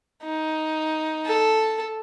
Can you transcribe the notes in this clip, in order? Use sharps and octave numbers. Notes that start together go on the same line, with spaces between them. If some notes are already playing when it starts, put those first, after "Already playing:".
D#4
A4